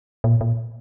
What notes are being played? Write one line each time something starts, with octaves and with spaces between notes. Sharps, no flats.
A#2
A#2